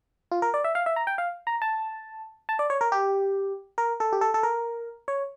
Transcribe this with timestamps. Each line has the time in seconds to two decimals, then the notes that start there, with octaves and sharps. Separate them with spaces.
0.31 F4
0.42 A#4
0.54 D5
0.64 E5
0.75 F5
0.86 E5
0.96 A#5
1.07 G5
1.18 F5
1.47 A#5
1.62 A5
2.49 A5
2.59 D5
2.70 C#5
2.81 A#4
2.92 G4
3.78 A#4
4.00 A4
4.13 G4
4.21 A4
4.34 A4
4.43 A#4
5.08 C#5